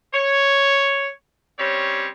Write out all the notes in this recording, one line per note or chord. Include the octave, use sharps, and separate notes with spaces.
C#5
G3 C4 C#4 C#5